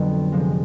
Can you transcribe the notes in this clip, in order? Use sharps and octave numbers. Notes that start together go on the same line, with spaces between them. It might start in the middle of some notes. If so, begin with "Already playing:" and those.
Already playing: F2 D3 F#3 B3
C3 F3 G#3